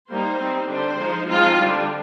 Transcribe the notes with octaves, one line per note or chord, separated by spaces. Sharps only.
G3 A#3 D#4 C5
G3 C4 D#4
D3 G3 D4 C5
F3 G#3 D#4
F3 G#3 C4 D#4 F4
D3 G3 D4